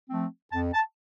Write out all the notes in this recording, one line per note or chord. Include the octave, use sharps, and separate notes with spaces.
F3 A3 C4
F2 A5
A5